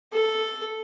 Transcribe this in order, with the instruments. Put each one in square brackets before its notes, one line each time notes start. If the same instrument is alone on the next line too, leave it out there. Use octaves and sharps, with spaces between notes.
[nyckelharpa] A4